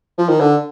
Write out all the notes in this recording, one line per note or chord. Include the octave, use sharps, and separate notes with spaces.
F3
D#3
D3